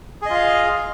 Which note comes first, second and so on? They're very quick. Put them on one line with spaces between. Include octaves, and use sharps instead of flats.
G#4 D#5 F4 F5